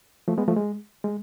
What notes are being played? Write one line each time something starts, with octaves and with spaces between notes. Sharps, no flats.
F3 A3
G#3 B3
F3 A3
G#3
G#3